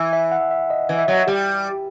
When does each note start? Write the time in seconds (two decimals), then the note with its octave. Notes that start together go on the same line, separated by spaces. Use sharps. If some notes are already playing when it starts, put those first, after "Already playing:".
Already playing: E3
0.13 E5
0.32 F#5
0.51 E5
0.70 D#5
0.89 E3
0.99 E5
1.08 F#3
1.13 F#5
1.27 G3 G4